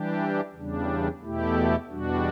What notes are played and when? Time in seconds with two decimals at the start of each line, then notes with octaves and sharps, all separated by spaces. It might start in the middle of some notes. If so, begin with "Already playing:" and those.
Already playing: E3 G3 D4 G4
0.54 E2 C#3 G3 D4
1.21 E2 B2 A3 E4 G4
1.89 E2 B2 G3 D4 F#4